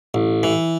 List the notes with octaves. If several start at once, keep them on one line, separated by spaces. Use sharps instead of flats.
A1
E3